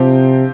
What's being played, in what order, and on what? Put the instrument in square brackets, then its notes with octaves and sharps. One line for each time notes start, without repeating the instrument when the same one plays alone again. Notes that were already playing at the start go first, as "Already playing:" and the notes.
Already playing: [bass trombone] C3 [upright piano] F3 C4 G4